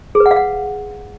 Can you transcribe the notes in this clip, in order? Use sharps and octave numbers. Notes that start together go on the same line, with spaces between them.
G#4
B4
F#5
F5
F#5